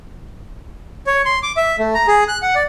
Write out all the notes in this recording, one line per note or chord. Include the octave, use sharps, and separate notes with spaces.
C#5
C6
D6
E5
A3
A#5
G#4
F#6
F#5
D5